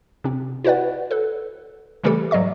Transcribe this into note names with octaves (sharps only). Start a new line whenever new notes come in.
C3 C4
E4 F#4 B4 D5 F#5
A4 B4
C#3 E3 G3 A3 G4 A4
G#2 F#3 D5 D#5 C#6